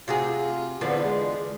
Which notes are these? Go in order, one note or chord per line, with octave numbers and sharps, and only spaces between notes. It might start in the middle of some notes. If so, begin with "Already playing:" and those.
C3 F4 F#4 G#4
E2 D3 F3 B3
G#3